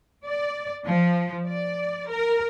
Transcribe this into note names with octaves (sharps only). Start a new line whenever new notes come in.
D5
F3
D5
A#4